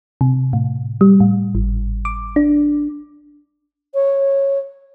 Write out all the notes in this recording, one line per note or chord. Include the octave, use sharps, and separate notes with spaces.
C3
A2
G3
A2
G#1
D6
D4
C#5